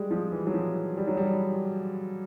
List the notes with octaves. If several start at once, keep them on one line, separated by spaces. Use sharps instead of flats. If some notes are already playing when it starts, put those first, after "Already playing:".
Already playing: G3 G#3
F3
E3
F#3
F3
G3
F#3
G3